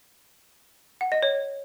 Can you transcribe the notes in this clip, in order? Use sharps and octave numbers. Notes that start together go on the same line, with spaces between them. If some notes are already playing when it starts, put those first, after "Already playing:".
F#5
D#5
C#5